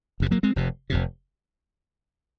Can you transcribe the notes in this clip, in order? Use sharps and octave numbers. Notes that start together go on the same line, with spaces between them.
F#1 F2 C3
F#3 A#3
G#3 C4
F1 F2 C3
F1 F2 C3